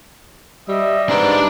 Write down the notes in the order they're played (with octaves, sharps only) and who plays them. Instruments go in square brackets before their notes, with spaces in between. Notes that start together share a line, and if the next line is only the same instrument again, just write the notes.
[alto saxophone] G3 [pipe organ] D#5 E5
[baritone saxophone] G#2 [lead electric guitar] D4 D5 [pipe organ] B4 D6